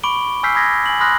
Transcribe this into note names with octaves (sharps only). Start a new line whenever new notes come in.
B5 C#6 D6 D7 G7
G#5 E6 F6 G6 B6 C7
B5 D#6 G#6 A#6 B6
G#5 F#7
B5 C6 D#6 F6 F#6 A#6